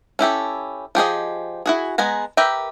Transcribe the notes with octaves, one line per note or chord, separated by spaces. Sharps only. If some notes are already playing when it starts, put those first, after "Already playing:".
C#4 E4 G4 A4
F3 G4 G#4 D#5
E4 F#4 G#4
G#3 B3 G#5 A#5
G4 A#4 B4 E5 G5